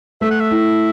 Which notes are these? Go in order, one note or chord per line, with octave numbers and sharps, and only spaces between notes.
A3 E5
F#5
E5
E4